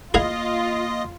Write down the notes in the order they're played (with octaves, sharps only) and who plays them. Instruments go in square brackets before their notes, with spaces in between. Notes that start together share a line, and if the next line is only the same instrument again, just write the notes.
[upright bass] A#3 [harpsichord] E4 G#4 F5 [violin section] F4 [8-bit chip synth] D#5